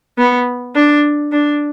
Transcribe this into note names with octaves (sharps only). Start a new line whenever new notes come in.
B3
D4
D4